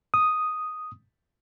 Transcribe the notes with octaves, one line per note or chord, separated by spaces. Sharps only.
D#6